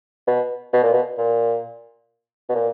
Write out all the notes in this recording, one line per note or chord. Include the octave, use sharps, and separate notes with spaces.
B2
B2
A#2
B2
A#2
B2
A#2